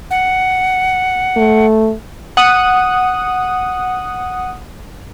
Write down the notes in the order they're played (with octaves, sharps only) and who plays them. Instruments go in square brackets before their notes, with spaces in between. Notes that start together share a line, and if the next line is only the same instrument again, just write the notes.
[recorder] F#5
[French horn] A3
[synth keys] F#5 D#6